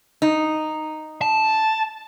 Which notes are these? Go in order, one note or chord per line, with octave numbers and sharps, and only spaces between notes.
D#4
A5